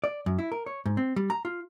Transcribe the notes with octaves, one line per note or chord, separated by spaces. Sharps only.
D5
F#2
E4
A#4
C#5
G#2
C4
G3
A#5
F4